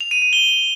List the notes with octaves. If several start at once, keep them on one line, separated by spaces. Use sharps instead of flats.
F7
D#7
D#7
G7